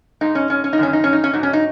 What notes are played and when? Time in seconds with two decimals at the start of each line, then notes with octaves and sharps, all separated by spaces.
0.21 G#2 G#3 D#4
0.35 C#4
0.50 C#4
0.64 C#4
0.73 D#4
0.78 F#2 D#3 F#3 C#4
0.93 D#4
1.04 C#4
1.13 D#4
1.24 C#4
1.33 G#2 F#3 D#4
1.43 C#4
1.53 D#4